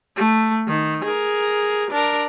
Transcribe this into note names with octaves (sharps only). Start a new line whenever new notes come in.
A3
D#3
G#4 A#4
D4 A#4